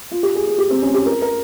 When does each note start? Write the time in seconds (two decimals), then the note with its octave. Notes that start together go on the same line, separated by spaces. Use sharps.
0.12 F4
0.23 G4
0.35 G#4
0.47 G#4
0.58 G4
0.70 C4
0.82 C#4
0.94 G4
1.06 A#4
1.22 A#4